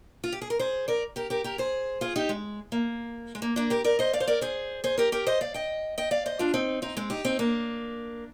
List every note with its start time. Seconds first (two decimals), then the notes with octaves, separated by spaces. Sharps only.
0.24 F4
0.33 G4
0.42 G#4
0.50 A#4
0.59 G#4 C5
0.88 A#4 D5
1.16 G4 A#4
1.30 G4 A#4
1.44 G4 A#4
1.58 G#4 C5
2.01 F4 G#4
2.16 D#4 G4
2.29 G#3
2.72 A#3
3.35 G#3
3.42 A#3
3.56 A#3 D4
3.70 G4 A#4
3.84 A#4 D5
3.99 C5 D#5
4.13 D5 F5
4.20 C5
4.28 A#4 D5
4.41 G#4 C5
4.84 G#4 C5
4.98 G4 A#4
5.12 G4 A#4
5.27 C5 D#5
5.41 D5 F5
5.54 D#5 G5
5.98 D#5 G5
6.11 D5 F5
6.26 C5 D#5
6.39 D4 F4
6.54 C4 D#4
6.82 C4 D#4
6.97 G#3 C4
7.10 D#4 G4
7.25 C4 D#4
7.39 A#3 D4